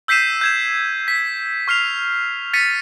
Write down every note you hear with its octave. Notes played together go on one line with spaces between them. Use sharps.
E6 G6 B6 C7 D#7 E7
G6 G#6 E7
B6
C#6 F6 C7 F7
A6 B6 C#7 D#7